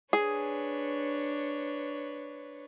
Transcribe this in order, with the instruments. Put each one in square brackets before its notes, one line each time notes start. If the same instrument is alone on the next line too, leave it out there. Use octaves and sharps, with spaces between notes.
[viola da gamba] D4 B4 C#5 [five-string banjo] G#4